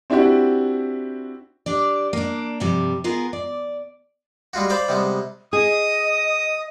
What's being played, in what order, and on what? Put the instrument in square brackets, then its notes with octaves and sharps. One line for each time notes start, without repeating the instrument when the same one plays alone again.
[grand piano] C4 D4 E4 F#4 G4
[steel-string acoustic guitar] D4 G4 D5
A#3 D4
G2 C3 F3 G3
B3 F4 G#4 A#4
D5
[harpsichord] G3 G#3 F4 F#4
C5 D5 F5 B5 C6 D6
C3 G3 G#3 B3
[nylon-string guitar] G#4 [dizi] D#5 [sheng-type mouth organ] D#6